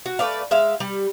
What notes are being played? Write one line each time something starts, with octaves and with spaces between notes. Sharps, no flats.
F#4
A3 B4 D5 F5
G#3 E5 F5
G3